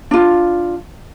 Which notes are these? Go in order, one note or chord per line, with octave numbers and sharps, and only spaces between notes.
D4 F4